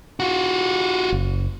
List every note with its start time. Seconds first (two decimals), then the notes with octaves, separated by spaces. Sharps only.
0.20 F4 F#4
1.12 F#1